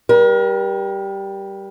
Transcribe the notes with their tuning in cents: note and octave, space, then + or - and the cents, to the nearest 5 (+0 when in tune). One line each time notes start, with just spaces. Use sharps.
G3 +0 A#4 +35